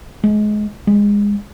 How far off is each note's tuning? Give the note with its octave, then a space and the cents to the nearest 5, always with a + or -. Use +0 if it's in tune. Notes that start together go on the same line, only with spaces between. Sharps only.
G#3 +25
G#3 -20